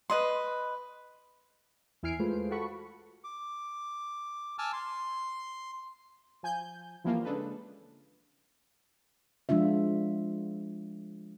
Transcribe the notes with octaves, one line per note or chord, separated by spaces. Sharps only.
B4 D#5 C6
E2 E4 G#5 F6 C7 D7
G#3 A3 F4 G#4 B4 C5
F4 F#4 A4 F#5 B5 C#6
D6
G#5 A5 D6 E6 F6
C6
F3 G#5 G6
E3 F3 G3 A#3 F4
C#3 G#3 D4 A4 B4
F3 G#3 D4 F4 E5